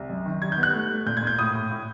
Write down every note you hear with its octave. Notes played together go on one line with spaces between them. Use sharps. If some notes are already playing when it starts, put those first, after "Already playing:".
Already playing: C2
F#2
D#3
G3 G#6
G6
B3
F#6
A3
A3
A#2 G6
G#6
A#2 G6
A2 D#6
A2
A2